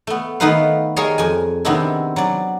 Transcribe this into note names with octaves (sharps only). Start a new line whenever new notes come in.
A3 B3
D#3 A3 B3 D#4 B4 F5
G3 G#4 A#4 C#5 D#5 G#5
F2 G#5
C3 D#3 B3 C4 D4 E4
F#3 D5